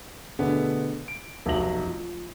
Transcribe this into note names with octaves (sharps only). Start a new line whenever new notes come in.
B2 D3 A3 B3 D4 G#4
D7
F1 B1 F#3 E5 A#6 F#7
F3